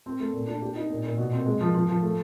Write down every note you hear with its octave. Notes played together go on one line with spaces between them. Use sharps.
C4
A3
A#2
D4
G4
D#4
A#2
A#2
B2
C4
G#3
F3
F3
F3
A3